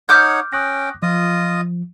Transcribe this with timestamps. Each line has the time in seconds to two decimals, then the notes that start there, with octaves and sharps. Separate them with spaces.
0.09 D#4 C#5 F#5 D6 F6 G6
0.53 C#4 G5 D#6 F#6 A#6
1.03 F3 F4 D#5 D#6